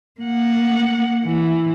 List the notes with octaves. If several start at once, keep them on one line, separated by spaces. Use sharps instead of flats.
A#3 F#5
E3